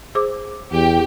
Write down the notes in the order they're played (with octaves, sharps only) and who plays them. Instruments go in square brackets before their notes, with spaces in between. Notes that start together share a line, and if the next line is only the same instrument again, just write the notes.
[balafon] G#4 C5 D6
[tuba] E2 [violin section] G4 G5